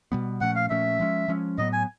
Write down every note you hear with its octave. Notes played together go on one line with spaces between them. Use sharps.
B2 G3 B3
A#2 F3 A3 C#4 F#5
F5
A#2 F3 A3 C#4 E5
F3 G#3 C#4
F3 G#3 C#4
A2 F#3 B3 D#5
G#5